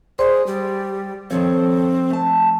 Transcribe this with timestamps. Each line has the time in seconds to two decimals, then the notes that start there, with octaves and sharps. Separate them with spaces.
0.19 G#4 C5 D5 C6
0.47 G3
1.31 D#3 F3 C4 A4 C#5
2.10 A3 A5